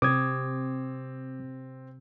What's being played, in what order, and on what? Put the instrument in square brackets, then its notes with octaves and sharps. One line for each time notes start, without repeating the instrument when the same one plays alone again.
[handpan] C3 [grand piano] C4 [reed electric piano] D6 D#6 G#6